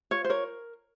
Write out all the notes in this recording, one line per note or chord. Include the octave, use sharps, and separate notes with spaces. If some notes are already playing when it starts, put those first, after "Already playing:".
F4 C#5
C5
A#4 C#5